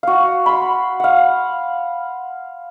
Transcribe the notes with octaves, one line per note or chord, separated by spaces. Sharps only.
F#4 F5
B5 C6
F5 F#5